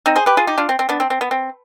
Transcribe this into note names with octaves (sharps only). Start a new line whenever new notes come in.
C4 D#4
G#4 C5
G4 B4
F4 G#4
D#4 G4
D4 F4
C4
C4
B3 D4
C4
C4
B3
C4